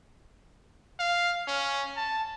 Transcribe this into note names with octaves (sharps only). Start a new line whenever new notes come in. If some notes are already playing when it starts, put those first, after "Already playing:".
F5
C#4
A5